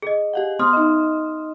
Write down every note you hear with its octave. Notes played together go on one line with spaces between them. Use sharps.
G#4 D#5
G4 F5 F#5
B3 C6 D#6 F6
D#4 D#5